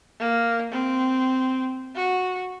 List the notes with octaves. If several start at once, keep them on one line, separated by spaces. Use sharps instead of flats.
A#3
C4
F#4